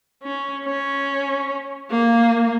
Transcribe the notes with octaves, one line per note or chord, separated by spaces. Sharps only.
C#4
C#4
A#3